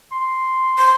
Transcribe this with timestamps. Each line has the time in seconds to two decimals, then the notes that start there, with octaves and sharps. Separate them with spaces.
0.12 C6
0.78 C5 C6